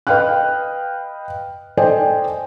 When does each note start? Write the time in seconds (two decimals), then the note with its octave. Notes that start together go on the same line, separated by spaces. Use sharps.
0.07 B4 D#5 F5 G5 F6 F#6
1.77 A4 C5 D5 D#5 G5 G#5